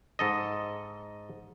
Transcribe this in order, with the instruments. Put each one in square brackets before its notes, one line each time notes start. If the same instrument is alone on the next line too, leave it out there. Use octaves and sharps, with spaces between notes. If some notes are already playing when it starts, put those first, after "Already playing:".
[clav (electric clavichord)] G#2 A4 D#5